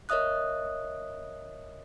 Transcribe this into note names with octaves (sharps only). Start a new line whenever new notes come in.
A#4 C#5 D#5 E5 D#6 F#6